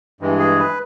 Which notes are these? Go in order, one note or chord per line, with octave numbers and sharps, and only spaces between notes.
G2 E3 G#3
G#4
B4